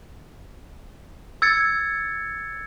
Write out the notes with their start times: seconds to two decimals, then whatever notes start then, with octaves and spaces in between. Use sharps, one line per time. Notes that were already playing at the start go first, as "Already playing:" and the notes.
1.42 E6 G#6 A6 C#7